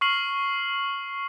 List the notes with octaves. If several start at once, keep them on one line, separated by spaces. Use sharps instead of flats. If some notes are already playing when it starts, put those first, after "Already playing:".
C#6 F6 C7 F#7